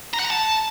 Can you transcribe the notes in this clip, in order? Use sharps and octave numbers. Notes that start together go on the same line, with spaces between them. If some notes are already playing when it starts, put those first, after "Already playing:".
A#5
F#5
A#5
A5